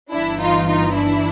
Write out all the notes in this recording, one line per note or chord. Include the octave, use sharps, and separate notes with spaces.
G1 G2 E3 D4 E4
D#4 F4
D#4 F4
D4 E4